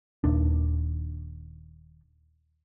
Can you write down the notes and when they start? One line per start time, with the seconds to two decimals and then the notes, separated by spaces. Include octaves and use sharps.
0.24 D#1 D#2 D#3 D4